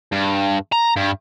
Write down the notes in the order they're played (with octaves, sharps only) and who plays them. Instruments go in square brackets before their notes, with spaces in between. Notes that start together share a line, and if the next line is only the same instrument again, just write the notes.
[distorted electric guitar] G2
A#5
G2